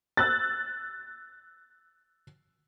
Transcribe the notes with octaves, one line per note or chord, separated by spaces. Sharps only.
E6 F#6 A6